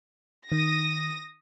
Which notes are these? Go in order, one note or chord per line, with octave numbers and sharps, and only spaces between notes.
D#3 D#6 A#6